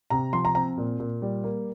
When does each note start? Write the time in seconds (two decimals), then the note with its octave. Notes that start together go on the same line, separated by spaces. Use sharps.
0.10 C3 A#5
0.33 F3 C6
0.45 A#5
0.55 C4 A#5
0.77 A#2
0.99 A#2
1.22 G3
1.44 A#3